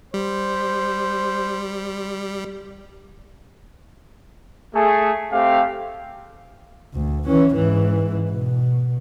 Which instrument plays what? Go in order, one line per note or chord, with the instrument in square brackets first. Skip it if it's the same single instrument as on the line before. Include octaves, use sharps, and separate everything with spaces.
[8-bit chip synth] G3 [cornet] C5
[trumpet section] A3 G#4
A3 C4 G4 F5
[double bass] D2
E3 C#4
G#2 E3
B2